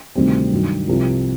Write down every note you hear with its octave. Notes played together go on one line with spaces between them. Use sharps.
D2 C3 D#3 G3 C4
G2 D#3 F#3
C2 C3 F3